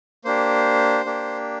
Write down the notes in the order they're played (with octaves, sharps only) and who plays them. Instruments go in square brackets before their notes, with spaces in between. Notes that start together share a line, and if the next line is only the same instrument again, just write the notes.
[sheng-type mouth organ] A#3 D4 G4 C5
A#3 D4 G4